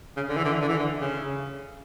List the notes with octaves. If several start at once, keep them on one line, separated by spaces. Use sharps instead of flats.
C#3
D3
E3
D3
E3
D3
E3
D3
C#3